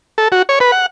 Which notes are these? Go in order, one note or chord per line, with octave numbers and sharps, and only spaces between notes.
A4
F#4
C#5
B4
F#5